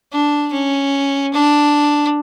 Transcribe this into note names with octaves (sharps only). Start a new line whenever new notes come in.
D4
C#4
D4